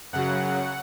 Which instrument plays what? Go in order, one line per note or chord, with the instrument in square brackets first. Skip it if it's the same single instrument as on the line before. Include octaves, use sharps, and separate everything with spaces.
[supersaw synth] F#2 C#3 F#3 F#5